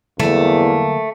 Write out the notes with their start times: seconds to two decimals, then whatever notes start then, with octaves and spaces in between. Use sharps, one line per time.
0.20 E2 D3 F#3 G3 A3 A#3